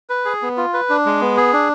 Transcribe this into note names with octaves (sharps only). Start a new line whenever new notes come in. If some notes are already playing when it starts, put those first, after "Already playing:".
B4
G#4
B3
F4
B4
D4
G#3
B3
G#4
D4